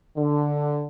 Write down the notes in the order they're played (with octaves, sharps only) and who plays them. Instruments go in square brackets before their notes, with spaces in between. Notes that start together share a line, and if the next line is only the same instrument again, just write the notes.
[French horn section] D3